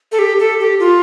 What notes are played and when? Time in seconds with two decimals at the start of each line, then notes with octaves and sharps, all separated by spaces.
0.12 A4
0.19 G4
0.40 A4
0.60 G4
0.80 F4